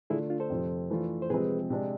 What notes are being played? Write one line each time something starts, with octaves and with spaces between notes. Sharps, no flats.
D3 A3 D4 E4 F4 G#4
D4 F4
A4 C5
F2 C3 F3
E3 A3 D4 F4
C5
C3 F3 G#3 C4 G#4 B4
C3 G#3 D4